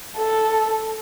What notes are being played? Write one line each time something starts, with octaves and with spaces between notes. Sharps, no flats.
A4